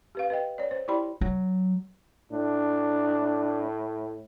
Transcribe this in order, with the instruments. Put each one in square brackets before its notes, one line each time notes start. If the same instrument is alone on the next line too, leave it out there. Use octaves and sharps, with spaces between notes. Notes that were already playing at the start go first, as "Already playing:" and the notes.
[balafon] G4 B4 F5
B4 D#5 G5
C#5 D5
C5
E4 G4 D5 G5 B5 C6
[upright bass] F#3
[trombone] A2 [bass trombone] D4